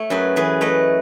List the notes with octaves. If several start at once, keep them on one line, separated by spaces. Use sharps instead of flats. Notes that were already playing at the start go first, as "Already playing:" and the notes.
Already playing: A3 C#5
F#2 G#4 B4
E3 G#4 B4
A3 B4 D#5